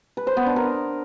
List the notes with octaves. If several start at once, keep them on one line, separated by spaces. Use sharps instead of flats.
B4
C5
B3
D4
A#4